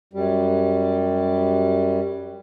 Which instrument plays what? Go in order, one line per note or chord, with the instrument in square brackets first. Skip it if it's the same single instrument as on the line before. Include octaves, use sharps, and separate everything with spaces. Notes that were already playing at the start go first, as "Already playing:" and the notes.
[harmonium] F#2 G3